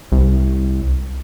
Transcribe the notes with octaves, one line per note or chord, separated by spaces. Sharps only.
C2